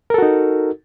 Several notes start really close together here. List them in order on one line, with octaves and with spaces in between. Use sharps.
A#4 A4 F#4 D#4